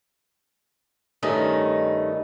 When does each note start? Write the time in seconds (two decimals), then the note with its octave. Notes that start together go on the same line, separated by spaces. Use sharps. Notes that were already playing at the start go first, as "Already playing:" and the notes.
1.23 G2 D#3 A3 C#4 D#4